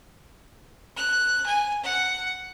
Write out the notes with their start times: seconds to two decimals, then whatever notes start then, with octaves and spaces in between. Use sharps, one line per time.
0.97 F#6
1.46 G#5
1.84 F#5